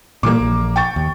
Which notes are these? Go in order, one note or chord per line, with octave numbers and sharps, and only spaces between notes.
A#2 E3 G3 A#3 D6
A#1
G5 C#6 A6
D#2